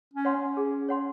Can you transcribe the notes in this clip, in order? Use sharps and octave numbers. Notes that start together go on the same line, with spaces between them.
C#4
C#5 F#5 C6
C#4
G#4
C#5 F#5 C6